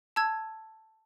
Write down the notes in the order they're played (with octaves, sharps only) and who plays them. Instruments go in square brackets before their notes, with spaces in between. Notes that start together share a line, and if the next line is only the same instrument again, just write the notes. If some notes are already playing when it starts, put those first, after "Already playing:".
[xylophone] A5 E6 G#6